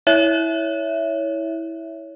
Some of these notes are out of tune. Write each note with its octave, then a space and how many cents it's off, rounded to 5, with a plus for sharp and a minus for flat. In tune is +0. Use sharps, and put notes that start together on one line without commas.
E4 -15 C#5 +15 E5 +0